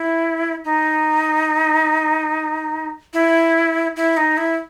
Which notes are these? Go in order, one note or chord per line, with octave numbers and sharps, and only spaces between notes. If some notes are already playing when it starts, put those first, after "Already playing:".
Already playing: E4
D#4
E4
E4
D#4
E4